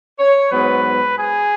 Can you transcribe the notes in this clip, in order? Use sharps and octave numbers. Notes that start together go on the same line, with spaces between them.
C#5
G#2 F#3 B3 B4
G#4